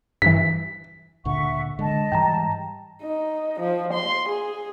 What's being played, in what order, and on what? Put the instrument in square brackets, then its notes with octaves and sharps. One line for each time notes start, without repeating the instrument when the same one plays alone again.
[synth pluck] G2 E3 [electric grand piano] B6
[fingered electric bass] D2 A#2 D3 [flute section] E5 F#5 C#6
[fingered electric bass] D3 G#3 [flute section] D#5 A5
[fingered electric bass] G#2 E3 G3 [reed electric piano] G5 A#5
[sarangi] D#4
F3
C6
G#4